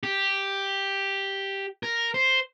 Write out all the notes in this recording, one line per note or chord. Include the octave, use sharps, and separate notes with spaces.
G4
A#4
C5